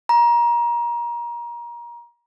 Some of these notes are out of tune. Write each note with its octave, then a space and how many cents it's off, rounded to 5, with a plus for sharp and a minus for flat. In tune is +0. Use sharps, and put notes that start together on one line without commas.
A#5 +25